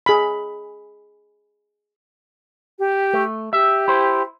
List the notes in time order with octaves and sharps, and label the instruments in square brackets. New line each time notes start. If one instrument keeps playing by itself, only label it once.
[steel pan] G#4 B5
[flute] G4
[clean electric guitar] A3
[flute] G4 [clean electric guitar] E5
[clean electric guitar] E4 C5